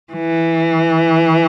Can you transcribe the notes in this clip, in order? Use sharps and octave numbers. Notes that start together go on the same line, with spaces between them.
E3